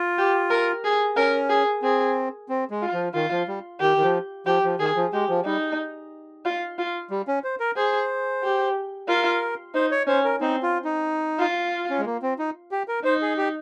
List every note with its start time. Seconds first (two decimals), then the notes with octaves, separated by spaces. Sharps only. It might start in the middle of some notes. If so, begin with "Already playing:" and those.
Already playing: F4
0.18 G4
0.50 A#4
0.85 G#4
1.17 C#4 A#4
1.49 G#4
1.82 C4 G#4
2.49 C4
2.70 G#3
2.82 F4
2.93 F3
3.14 D#3 F4
3.31 F3
3.48 G3
3.80 D#3 G4
3.97 D#3
4.03 F3
4.46 F3 G4
4.64 F3
4.79 D#3 G#4
4.96 F3
5.13 G#3 G4
5.29 F3
5.45 G3 D#4
6.45 F4
6.78 F4
7.10 G3
7.28 C#4
7.44 C5
7.60 A#4
7.76 G#4 C5
8.43 G4
9.08 F4 A#4
9.74 D#4 C5
9.91 C#5
10.07 C#4 C5
10.24 A#4
10.41 C4 D#4
10.63 F4
10.85 D#4
11.39 F4
11.90 C#4
11.99 G#3
12.06 A#3
12.22 C4
12.39 D#4
12.71 G4
12.88 A#4
13.05 D#4 C5
13.22 G#4
13.37 G4